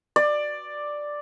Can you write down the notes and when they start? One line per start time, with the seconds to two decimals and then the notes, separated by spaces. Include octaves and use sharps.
0.16 D5